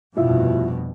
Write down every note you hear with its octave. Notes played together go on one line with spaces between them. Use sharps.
F1 G2 B2 E4 F4 E5